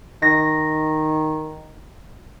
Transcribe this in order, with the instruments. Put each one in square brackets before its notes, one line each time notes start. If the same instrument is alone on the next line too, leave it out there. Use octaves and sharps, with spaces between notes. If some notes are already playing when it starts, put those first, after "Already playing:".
[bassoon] D#3 [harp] A#6